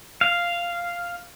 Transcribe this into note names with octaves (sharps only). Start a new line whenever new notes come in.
F5